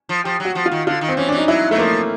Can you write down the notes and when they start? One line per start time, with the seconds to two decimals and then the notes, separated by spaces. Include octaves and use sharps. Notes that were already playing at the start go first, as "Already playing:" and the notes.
0.09 F3
0.24 F3 G4
0.40 F#3
0.45 F#4
0.55 F3
0.66 F4
0.72 D#3
0.87 D3 F4
1.01 D#3
1.08 C4
1.17 E3 C#4
1.29 E3 D4
1.38 D#4
1.48 F#3 E4
1.71 F#3 A3
1.78 F3 A#3